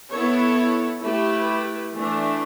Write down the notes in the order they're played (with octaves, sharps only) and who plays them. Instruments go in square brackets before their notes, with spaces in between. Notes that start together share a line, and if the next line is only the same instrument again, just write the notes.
[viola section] B3 E4 A4 C#5
A3 E4 G4 B4
E3 A3 D4